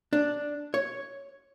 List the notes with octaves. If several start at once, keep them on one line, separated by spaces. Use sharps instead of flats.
D4
C#5